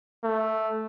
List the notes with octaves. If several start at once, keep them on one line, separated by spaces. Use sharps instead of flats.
A3